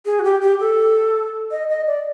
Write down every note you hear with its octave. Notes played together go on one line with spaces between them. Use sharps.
G#4
F#4
G4
G4
A4
D#5
D#5
D5